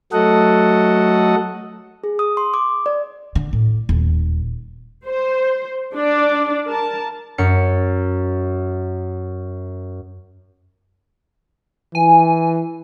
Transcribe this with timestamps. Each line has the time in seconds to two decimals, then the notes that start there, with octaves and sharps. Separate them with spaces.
0.13 F#3 A3 F#4 A4 D#5 F#5
2.04 G#4
2.19 D#6
2.37 C6
2.54 D6
2.86 D5
3.35 D3
3.53 A2
3.89 D#1
5.06 C5
5.95 D4 D5
6.66 A#4 A5
7.38 F#2 C#4 C#7
11.95 E3 G#5